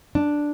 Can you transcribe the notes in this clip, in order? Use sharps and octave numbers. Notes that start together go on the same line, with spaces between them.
D4